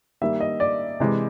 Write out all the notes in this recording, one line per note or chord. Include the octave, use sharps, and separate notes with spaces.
D#3 G3 A#3 E5
D#5
D5
C3 E3 G#3